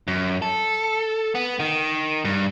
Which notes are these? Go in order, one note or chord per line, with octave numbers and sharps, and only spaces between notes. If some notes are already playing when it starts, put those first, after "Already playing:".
F#2
A4
B3
D#3
G2